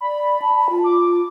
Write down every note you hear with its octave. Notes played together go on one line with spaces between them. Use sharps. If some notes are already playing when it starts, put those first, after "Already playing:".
D5 B5
A5
A5
F4
D6